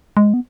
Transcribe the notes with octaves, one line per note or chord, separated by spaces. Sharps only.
G#3
B3